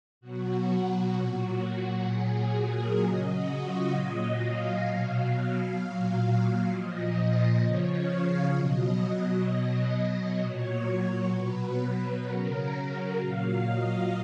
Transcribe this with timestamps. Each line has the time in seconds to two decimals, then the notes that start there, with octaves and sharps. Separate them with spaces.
0.21 B2 F#3 F#4
1.13 A#2 F#3
2.05 A#2 F#3 G#4
2.36 G#4
2.68 A#4
2.98 C#3 F#3 D#5
3.29 F#4
3.60 F4
3.91 A#2 F#3 D#5
4.37 F5
4.83 B2 F#3
5.76 A#2 F#3
6.69 A#2 F3 D#5
7.15 D#5
7.61 C#3 F3 C#5
7.92 F5
8.23 F5
8.54 B2 F#3 D#5
9.47 B2 F#3
10.39 A#2 F#3 C#5
10.85 C#5
11.32 B2 F#3 B4
12.24 C#3 F#3 A#4
13.17 A#2 F#3 F5
13.64 D#5